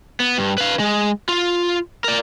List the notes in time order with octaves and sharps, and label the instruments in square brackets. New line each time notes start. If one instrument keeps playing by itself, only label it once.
[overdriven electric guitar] B3
G2
B4 F5
G#3
F4
A#4 D5